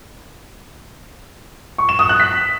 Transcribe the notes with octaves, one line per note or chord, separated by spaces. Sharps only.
C#6
E7
D#6
F#6
B6